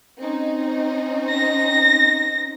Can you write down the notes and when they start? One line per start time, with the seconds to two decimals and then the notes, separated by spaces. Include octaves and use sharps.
0.18 C4 C#4 D#4
1.29 A#6